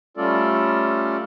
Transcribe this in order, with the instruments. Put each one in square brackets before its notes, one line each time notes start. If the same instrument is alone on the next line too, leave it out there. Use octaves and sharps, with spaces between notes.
[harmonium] G3 A3 C#4 F4 A4 D5